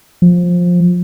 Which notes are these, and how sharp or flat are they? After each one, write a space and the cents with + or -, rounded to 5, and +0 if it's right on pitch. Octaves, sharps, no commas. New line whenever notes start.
F3 +15